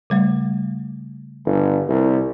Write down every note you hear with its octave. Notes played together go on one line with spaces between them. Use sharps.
C#3 G3 A3
G1
C2